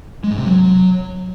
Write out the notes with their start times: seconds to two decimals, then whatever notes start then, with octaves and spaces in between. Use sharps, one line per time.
0.24 G#3
0.31 G#2
0.38 C3
0.45 F#3